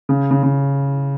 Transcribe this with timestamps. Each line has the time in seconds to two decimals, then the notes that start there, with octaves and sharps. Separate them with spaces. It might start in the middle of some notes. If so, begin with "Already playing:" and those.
0.09 C#3
0.31 C#3
0.43 C#3